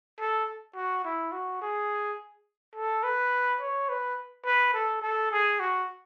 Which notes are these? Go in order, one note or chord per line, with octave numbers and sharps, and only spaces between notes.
A4
F#4
E4
F#4
G#4
A4
B4
C#5
B4
B4
A4
A4
G#4
F#4